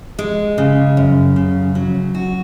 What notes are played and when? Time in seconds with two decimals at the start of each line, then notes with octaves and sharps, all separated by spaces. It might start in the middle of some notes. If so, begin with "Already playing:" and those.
0.19 G#3
0.58 C#3
0.97 F#2
1.36 C#3
1.75 F#3
2.15 F#4